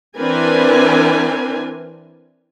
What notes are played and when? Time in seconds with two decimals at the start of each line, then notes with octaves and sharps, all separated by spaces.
0.16 E3 C4 D4 A#4 B4 G#5